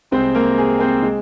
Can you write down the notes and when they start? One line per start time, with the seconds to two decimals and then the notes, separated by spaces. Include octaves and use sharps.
0.11 C2 C3 G#3 C4 C5
0.35 A#3 A#4
0.58 G#4
0.80 C4 C5
1.02 G#3